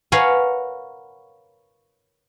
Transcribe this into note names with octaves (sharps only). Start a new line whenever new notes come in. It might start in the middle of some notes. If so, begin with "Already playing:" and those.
A#4 B4 C#5 F5 F#5 G#5